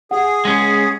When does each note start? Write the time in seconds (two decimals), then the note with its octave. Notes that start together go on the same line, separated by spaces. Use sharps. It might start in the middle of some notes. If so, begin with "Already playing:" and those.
0.11 G#4 F#5
0.45 G#3 C#4